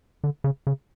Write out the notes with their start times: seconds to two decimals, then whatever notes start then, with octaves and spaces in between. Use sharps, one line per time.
0.24 D3
0.44 C#3
0.67 C#3